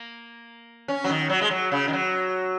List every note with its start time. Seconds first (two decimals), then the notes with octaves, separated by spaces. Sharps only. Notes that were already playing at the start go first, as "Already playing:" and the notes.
Already playing: A#3
0.88 C#4
1.04 F#3
1.09 D#3
1.30 F#3
1.41 G#3
1.50 F#3
1.72 C#3
1.88 D#3
1.93 F#3